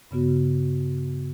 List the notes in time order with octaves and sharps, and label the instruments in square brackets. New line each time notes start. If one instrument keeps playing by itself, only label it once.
[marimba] G2 C#3 B3 F#4